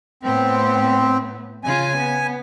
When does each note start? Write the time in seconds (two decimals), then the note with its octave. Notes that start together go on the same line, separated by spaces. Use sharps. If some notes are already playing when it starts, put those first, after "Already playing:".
0.23 A2 B3 C4
1.64 C#3 F4 G#5
1.98 B3